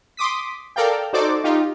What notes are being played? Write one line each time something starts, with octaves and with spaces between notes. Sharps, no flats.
C6 D6 D#6 B6
A4 A#4 D5 F5 G5
D#4 F#4 A4 C5 D5 D6
D#4 F4 G4